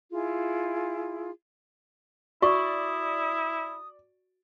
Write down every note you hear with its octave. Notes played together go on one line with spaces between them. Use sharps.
E4 F4 G#4
E4 F#4 D5 C#6 D#6